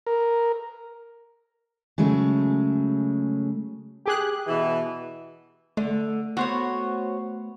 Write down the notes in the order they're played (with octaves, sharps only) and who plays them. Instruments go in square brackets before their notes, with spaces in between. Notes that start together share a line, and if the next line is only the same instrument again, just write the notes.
[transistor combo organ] A#4
[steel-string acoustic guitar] C#3 F#3 G#3 A3
[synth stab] G4 G#4 F#6
[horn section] B2 E3
[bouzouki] D3 [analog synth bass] A3
[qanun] B3 [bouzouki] F#4 C5 C#5